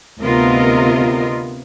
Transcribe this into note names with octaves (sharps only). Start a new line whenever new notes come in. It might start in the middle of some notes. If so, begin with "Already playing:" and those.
D2 C3 B3 F4 A#4 D#5